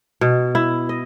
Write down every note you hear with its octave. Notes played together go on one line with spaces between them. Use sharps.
B2
E4
D#5